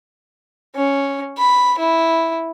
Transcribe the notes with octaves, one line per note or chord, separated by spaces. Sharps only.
C#4
B5
E4